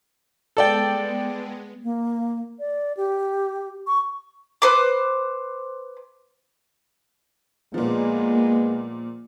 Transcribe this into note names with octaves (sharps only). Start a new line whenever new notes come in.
G#3 B3 A4 D5 G5
A#3
D5
G4
C#6
B4 C5 D6
A#2 F3 G#3 A#3 B3